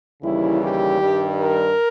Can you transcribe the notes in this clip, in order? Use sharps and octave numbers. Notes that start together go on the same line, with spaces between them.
D#2 C#3 E3 G3 E4
G4
G2 D#3 G3
A#4